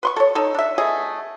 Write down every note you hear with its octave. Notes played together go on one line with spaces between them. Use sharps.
B4 C6 C#6
A4 C#5
D#4 A4
D4 E5
A3 B3 G#4 D#5